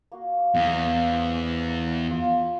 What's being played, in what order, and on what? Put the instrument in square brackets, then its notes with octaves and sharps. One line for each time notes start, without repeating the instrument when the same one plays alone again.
[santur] A#3 F#4 F5
[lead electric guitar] E2 [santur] F5
[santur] C5 D5
A#4
F4